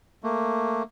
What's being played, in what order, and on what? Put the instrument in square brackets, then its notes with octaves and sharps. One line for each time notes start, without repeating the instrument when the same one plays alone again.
[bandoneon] A3 A#3